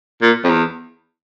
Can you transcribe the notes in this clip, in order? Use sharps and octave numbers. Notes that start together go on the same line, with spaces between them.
A#2
F2
E2